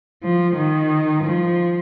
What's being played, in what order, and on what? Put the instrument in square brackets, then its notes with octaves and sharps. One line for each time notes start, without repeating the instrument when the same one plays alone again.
[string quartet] F3
D#3
F3